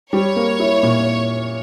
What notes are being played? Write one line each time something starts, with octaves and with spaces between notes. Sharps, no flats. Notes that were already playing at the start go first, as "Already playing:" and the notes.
G3 C#5
A#3
E4
A#2